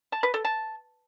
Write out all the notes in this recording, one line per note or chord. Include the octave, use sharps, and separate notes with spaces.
A5
B4
A4
A5